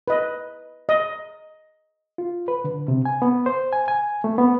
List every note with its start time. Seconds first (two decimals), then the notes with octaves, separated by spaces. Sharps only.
0.08 B4 D#5
0.89 D#5
2.18 F4
2.48 B4
2.64 D3
2.88 C3
3.05 G#5
3.22 B3
3.46 C5
3.73 G#5
3.88 G#5
4.24 A3
4.38 B3